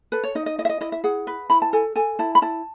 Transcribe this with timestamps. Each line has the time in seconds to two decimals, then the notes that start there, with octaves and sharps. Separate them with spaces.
0.12 A4 B4
0.24 C#5
0.35 D#4 D#5
0.46 D#5
0.58 E4 D#5
0.65 E5
0.69 D#5
0.81 E4 D#5
0.92 E5
1.04 G#4 F#5
1.27 B4
1.50 E4 B5
1.62 A5
1.73 A4 G#5
1.96 A4 G#5
2.19 E4 A5
2.35 B5
2.42 E4 A5